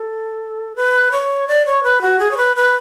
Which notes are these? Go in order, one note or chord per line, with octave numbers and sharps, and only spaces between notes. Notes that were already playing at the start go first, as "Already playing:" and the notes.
Already playing: A4
B4
C#5
D5
C#5
B4
F#4
G#4
C#5
B4
B4